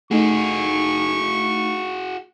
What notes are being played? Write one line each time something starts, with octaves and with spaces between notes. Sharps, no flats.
A3 D#4 F#4 G#4 C#6